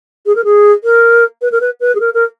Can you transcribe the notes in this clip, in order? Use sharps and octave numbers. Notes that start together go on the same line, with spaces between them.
G#4
A#4
G#4
A#4
B4
A#4
B4
B4
G#4
A#4
A#4